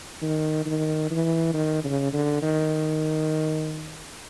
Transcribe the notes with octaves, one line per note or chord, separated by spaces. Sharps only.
D#3
D#3
E3
D#3
C#3
D3
D#3